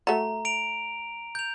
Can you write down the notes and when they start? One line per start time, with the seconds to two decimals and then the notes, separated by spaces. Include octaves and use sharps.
0.07 A3 F#4 A#5
0.45 A#5 D7 F7
1.35 G6 F7